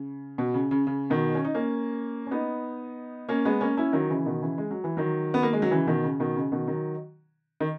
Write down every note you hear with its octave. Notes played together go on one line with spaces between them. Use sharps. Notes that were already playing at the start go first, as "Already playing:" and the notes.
Already playing: C#3
B2
C#3
C#3
C#3
B2 D#3
C#4
D#4
A#3 C#4
C#4
B3 D#4
A#3 C#4
G#3 B3
A#3 C#4
C#4 E4
D#3 F#3
C#3 E3
B2 D#3
C#3 E3
G#3
F#3
E3
D#3 F#3
B3
A#3
G#3
F#3
C#3 E3
B2 D#3
C#3
B2 D#3
C#3
B2 D#3
D#3 F#3
D#3